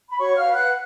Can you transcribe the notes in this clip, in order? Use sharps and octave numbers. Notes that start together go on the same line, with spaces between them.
B5
F#4 C#5 C#6
F5 F6
B4
F#5 F#6